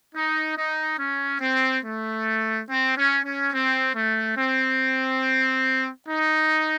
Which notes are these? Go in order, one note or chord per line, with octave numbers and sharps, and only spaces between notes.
D#4
D#4
C#4
C4
A3
C4
C#4
C#4
C4
A3
C4
D#4